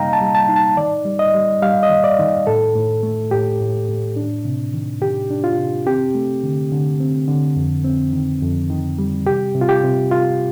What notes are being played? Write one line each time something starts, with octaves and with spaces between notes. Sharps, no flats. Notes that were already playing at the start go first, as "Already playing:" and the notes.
Already playing: C3 G3 A#3 D#4 D#5 F5 G5 A#5
A5
G3
A5
D#4
A5
D#3 D5
G3
D#5
G3
G3 F5
D#5
D#3
D5
D#3
A2 A4
A2
A3
A2 G4
A2
A2
D4
C3
D#3
D#3 G4
D4
F4
C3
C4 G4
A3
D3
D3
C4
D3
F2
C4
D#3
F2
D#3
G3
C3 G4
C3
F4
G4
C3
F4